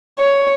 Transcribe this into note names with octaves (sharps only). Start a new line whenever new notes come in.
C#5